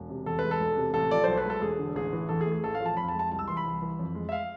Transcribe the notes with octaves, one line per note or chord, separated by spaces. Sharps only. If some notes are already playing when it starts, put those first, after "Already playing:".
Already playing: E1
C3
E2 A4
G#3 B4
A4
E1
C3
A1 A4
F3 D5
B1 C5
B4
G#3 A4
E1 G#4
D3
A1 G#4
E3
E2 A4
G#4
A3
G#4
A1 A4
F5
F3
A5
F2 B5
A5
G#3
A5
C2 A5
E6
E3 C6
B5
C2
E3
F2
G#3
E5
F5